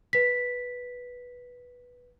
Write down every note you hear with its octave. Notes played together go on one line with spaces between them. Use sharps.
B4 B6